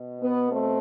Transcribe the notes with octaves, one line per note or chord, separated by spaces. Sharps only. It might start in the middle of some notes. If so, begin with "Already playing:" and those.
Already playing: B2
B3
A3 C4